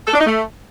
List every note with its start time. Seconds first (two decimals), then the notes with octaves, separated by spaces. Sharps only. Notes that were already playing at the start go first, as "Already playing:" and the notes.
0.07 A4
0.13 D4
0.20 D#4
0.26 A3